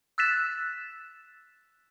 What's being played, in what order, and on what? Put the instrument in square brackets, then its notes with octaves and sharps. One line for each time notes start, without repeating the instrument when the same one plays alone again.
[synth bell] E6 F#6 A6 B6 E7